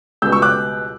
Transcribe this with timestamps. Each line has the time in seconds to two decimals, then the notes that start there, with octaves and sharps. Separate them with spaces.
0.22 C#2 B2 G3 B3 E6 G6
0.32 C#6 E6
0.42 D6 F#6